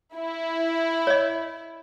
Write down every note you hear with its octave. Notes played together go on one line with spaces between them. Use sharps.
E4
C#5 D#5